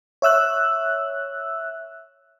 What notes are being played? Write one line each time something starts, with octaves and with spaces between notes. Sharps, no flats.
C#5 E5 E6 F#6